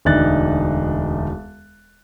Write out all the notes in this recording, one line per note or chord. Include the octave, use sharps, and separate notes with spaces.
E1 D2 D4 D#4 F#6 A6